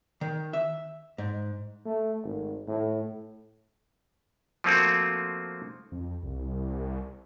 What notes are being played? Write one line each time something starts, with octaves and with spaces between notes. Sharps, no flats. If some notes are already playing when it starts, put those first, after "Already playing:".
D#3
E5
G#2
A3
G#1
A2
F3 A3 A#3 C4 F4 F#4
F2
C2